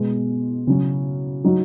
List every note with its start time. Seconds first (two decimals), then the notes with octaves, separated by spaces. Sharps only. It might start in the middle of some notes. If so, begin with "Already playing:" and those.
Already playing: B2 G#3 B3
0.67 C#3 F#3 C#4
1.44 F#3 D#4 F#4